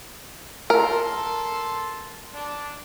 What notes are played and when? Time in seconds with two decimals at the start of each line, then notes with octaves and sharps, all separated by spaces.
0.70 A4 A#4 C6
2.33 D4